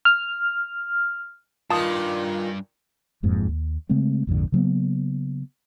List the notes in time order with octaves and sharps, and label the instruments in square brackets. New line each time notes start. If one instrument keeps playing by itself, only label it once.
[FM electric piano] F6
[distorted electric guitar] G2 [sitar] A#2 D#3 [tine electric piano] F4 [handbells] A5 D#6
[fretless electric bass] E1 F2 G#2 A#3
D#2
C#3 G#3 A3 C4
A#1 F2 G#2 D3
C#3 F#3 A#3 B3